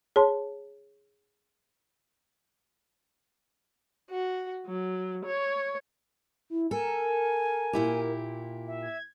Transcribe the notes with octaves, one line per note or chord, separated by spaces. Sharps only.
G#4 C#5 A5 C6
F#4
F#3
C#5
E4
A4 A#4 G#5
A#2 E4 G4
E5
G#6